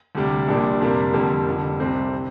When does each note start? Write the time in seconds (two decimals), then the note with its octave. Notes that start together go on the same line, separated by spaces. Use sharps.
0.15 D2 C3 G3 D4
0.48 A#1 A#2 G3 D4
0.80 F2 C3 G3 A#3 D4
1.13 F2 D3 G3 A#3
1.47 F1 F2 D3 G3
1.80 C2 C3 G3 C4
2.14 C3